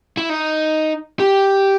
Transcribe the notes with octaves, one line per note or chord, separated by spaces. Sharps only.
E4
D#4
G4